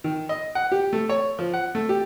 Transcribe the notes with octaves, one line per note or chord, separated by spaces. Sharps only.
D#3
D#5
F#5
G4
A3
C#5
F3
F#5
A3
G4